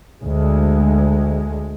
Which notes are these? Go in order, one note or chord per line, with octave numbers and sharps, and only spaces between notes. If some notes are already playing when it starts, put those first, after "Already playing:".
D2 G#3